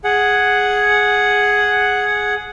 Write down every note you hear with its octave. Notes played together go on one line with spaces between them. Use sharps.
G#4 F#5